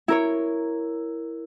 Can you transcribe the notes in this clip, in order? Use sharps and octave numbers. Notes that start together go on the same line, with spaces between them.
E4 A#4 C#5